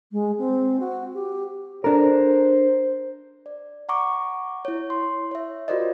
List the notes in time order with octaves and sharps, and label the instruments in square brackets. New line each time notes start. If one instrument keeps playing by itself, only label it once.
[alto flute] G#3
C4
F#4
G4
[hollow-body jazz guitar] D4 A4 A#4 [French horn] C5
[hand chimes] D5
F#5 A#5 C#6 D6
E4 C#5
C6
C#5 E5
F4 F#4 A#4 C5 D5 D#5